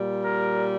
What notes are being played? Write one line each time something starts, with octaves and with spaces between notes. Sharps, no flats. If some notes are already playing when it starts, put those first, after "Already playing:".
Already playing: A#2 G3
A#4